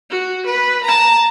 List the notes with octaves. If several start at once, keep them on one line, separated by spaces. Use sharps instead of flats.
F#4
B4
A5 A#5